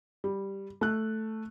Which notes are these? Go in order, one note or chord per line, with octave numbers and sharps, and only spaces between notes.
G3
A3 F#6